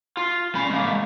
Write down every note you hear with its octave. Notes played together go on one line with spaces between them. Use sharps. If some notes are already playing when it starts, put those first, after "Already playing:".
F4
C#4 B5
G#3 A#3